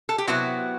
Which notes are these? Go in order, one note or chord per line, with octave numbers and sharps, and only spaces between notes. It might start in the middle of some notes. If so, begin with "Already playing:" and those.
A4
G4
C3 F#3 B3 E4 F#4